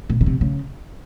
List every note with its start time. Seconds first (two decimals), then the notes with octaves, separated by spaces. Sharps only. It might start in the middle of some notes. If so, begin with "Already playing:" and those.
0.10 B2
0.21 C#3
0.26 C3
0.41 C#3